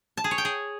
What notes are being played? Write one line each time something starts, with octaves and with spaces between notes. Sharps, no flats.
A5
G#4
C#5
G5
G#4